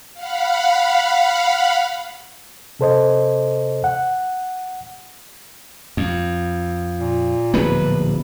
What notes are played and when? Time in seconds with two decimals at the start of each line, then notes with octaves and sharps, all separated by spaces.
0.13 F5 F#5 B5
2.79 C3 A4 C5 D#5
3.84 F#5
5.97 F2
6.99 A#2
7.54 D1 A#1 B3 B4